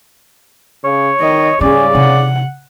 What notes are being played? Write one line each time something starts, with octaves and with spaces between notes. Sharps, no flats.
C#3 C#5
D#3 D#5
G#2 C#3 G3 C#4 G#4 D5
C3 F#5